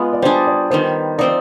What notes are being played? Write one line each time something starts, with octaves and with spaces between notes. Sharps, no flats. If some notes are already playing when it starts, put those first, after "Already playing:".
Already playing: G#3 B3 F4
D5
G3 D4 G#4 C5
D5
D#3 G3 B3 C5
F3 C4 D#4 D5